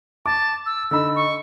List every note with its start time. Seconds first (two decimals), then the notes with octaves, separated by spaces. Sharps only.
0.26 A5 D6
0.66 E6
0.91 D3 D#4 B5 E6
1.16 C#6